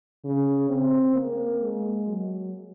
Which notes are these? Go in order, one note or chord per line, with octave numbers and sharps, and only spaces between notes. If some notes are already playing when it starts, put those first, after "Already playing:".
C#3
C4
A#3
G#3
F#3